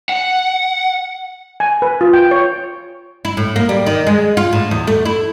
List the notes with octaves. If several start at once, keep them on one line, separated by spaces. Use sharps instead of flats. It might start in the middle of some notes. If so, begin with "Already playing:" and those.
F#5
G#5
B4
F4
G5
C#5
E4
A2
A#3
G3
D#3
G#3
F4
A2
E2
A3
E4